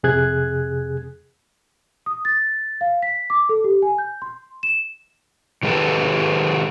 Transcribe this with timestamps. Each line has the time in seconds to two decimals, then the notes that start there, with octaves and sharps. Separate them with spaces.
0.03 F2 C3 G#4 F#6 G#6
2.06 D#6
2.25 A6
2.81 F5
3.02 B6
3.30 D6
3.49 A4
3.64 G4
3.82 G#5
3.98 G6
4.22 C6
4.63 E7
5.63 D#3 G#3 B3 G4 A4 B4